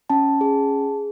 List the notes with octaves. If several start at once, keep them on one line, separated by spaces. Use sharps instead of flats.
C#4 A5
G#4